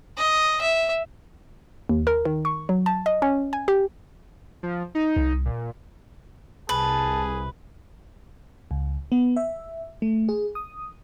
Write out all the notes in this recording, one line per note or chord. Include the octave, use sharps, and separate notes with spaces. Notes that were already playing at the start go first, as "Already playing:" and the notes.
D#5
E5
D#2
A#4
D#3
C#6
F#3
A5
D#5
C#4
G#5
G4
F3
D#4
C2
A#2
C2 G#4 B4 A5
C#2
B3
E5
A3
G#4
D#6